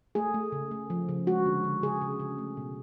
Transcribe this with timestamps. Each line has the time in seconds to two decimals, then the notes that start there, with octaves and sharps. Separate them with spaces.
0.15 A3 G#4
0.34 A3
0.52 C#3
0.71 A3
0.90 F3
1.09 C#3
1.27 G#3 F#4
1.46 D3
1.64 D3
1.82 C#3 G#4
2.01 C#3
2.20 C#3
2.38 A3
2.57 B2